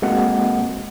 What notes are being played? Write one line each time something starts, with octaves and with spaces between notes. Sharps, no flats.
G#3 A#3 C4 F#4 F#5